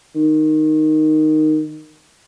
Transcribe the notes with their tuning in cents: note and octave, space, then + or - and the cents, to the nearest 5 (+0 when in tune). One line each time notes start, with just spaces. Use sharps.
D#3 -5